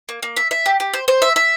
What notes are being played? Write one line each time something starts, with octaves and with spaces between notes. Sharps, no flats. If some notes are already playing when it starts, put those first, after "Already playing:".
A#3
A#3
E5
E5
G4
G4
C5
C5
E5
E5